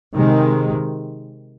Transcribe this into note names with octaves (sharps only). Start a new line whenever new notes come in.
C3 D#3 G#3